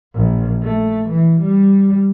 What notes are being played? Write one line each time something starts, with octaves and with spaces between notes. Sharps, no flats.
A#1
A3
E3
G3